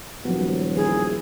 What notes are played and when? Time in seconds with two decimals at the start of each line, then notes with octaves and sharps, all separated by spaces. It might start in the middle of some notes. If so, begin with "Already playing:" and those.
0.25 D#1 F3 F#3 B3
0.76 E3 E4 G#4